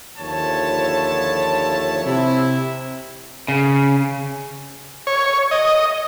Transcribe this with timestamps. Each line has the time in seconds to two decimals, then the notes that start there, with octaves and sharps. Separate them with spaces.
0.18 D#2 D3 F3 E4 C#5 A5
2.04 C3 E4
3.48 C#3
5.07 C#5
5.51 D#5